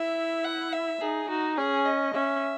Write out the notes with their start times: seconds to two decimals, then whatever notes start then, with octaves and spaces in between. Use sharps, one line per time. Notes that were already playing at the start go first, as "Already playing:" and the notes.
Already playing: E4 E5
0.45 F#5
0.73 E5
1.01 D#4 G#4
1.29 D#4 F#4
1.57 C#4 G#4
1.85 D#5
2.14 C#4 E5